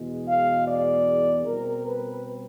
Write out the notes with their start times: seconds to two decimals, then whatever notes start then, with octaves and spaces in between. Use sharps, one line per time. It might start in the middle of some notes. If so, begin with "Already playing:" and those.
Already playing: E2 B2 G#3
0.27 F5
0.66 D5
1.46 B2 G3 C4 A#4
1.86 B4